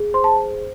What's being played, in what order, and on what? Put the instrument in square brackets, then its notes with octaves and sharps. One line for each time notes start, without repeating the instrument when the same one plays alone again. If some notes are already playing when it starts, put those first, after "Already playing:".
Already playing: [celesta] G#4
C5 C6
A5